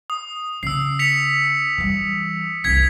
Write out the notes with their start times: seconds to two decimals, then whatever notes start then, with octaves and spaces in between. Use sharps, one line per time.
0.10 D#6
0.63 C#3 E6 C7
0.99 B6 C#7 F7
1.78 E3 G3
2.64 F1 C2 G#6 B6